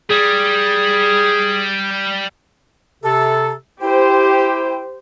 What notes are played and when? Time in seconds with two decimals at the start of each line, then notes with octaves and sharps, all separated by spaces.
0.10 G3 G#4
3.04 C3 A4
3.81 E4 G4 C5 G5